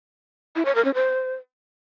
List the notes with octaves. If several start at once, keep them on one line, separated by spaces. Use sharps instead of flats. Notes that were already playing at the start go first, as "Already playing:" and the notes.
E4
C#5
A#4
C#4
C5